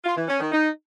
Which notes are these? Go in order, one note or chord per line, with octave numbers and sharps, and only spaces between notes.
F4
E3
C#4
D#3
D#4